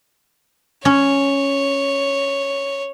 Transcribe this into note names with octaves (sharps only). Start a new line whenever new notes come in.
C#4 C#5